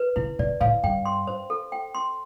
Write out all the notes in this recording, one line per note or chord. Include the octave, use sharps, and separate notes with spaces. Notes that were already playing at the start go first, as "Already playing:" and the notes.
Already playing: B4
B2 E4
B2 D5
A2 F5
G2 G5
C6
C5
A4
G5
C6